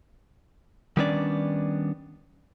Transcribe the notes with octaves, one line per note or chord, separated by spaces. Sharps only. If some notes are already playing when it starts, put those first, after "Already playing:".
D#3 G3 B3 C#4 D4 D5